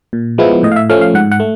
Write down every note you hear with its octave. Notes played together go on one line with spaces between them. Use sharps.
A#2
F3 G#3 B3 E4
A2 D#5
F5
E5
F3 A3 C#4 F5
F5
G#2 F#5
F#5
A3